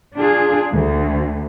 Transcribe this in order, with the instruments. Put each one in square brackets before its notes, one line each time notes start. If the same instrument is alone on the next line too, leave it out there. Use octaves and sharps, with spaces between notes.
[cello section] D4 F4 G#4
D2